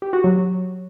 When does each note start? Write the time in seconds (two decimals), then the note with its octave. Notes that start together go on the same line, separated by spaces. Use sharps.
0.02 G4
0.13 F#4
0.24 F#3